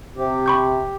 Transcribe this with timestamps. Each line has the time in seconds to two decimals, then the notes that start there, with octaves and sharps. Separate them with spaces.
0.16 C3 G4
0.46 B5 C#6 G6